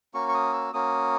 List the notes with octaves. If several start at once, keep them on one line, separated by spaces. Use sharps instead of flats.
A#3 C#4 F#4 C#6
C#6
D#6
E6
A#3 C#4 F#4 D#6